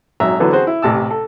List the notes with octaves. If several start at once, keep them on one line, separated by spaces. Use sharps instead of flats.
G#1 F#3 E5 A#5
D3 E3 F#3 B3 A4
C4 F#4 G#4 C5
E4
A1 C3 A5 E6
A4